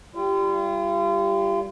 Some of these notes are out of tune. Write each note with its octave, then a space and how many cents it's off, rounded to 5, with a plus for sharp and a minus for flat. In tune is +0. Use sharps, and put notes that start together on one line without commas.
G3 +0 F4 -35